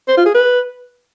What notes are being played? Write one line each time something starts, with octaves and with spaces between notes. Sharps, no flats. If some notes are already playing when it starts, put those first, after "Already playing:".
C5
F4
G#4
B4